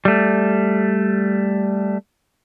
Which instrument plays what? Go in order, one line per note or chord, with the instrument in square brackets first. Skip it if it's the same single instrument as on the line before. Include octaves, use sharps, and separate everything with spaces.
[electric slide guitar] G3 A3